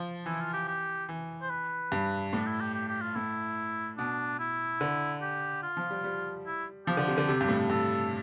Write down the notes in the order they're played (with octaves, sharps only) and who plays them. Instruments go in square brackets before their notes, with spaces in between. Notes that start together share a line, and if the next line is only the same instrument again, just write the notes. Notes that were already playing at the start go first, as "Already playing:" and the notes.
Already playing: [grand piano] F3
[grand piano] E3 [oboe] E4
[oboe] F4
G4
G4
[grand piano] E3
[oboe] C5
B4
[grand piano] G2
[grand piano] A2 [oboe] D4
[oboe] E4
G4
G4
G4
F4
[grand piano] A2 [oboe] E4
[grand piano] B2 [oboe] D4
[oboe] E4
[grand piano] D3
[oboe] G4
F4
[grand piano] F3
G3
G3
[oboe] E4
[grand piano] F3 [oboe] G4
[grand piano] D3
C3
D3
C3
G2
A2
[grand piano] G2 [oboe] A4